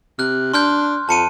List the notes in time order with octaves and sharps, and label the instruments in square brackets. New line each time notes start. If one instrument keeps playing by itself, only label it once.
[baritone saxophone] C3 [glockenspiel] F6 F#6
[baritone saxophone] D4 [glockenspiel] C6 F6 G6
[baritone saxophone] F2 [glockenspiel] A5 C#7 D#7